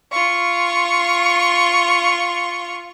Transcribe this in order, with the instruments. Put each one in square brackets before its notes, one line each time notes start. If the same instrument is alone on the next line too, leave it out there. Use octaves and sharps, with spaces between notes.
[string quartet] F4 C#6